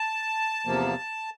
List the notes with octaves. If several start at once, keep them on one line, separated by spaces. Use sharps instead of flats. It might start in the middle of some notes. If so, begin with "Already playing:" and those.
Already playing: A5
E2 C3 F3 A#3